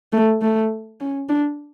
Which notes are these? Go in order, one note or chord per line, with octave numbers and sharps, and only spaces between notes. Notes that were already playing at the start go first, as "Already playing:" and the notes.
A3
A3
C#4
D4